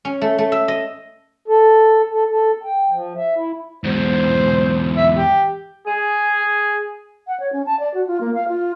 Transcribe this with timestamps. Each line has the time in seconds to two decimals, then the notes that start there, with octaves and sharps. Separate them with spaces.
0.05 C#4
0.21 A3
0.38 A3
0.52 E5
0.68 D#5
1.48 A4
2.11 A4
2.31 A4
2.64 G5
2.91 F3
3.17 E5
3.36 E4
3.84 E2 G#2 C5
4.97 E5
5.14 G4
5.86 G#4
7.27 F#5
7.40 C#5
7.53 C#4
7.66 A5
7.79 D5
7.94 F#4
8.07 F4
8.21 A#3
8.34 F5
8.49 F4